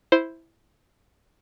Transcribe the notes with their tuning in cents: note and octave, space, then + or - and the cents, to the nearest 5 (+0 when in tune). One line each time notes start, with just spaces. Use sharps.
E4 +0 C5 +0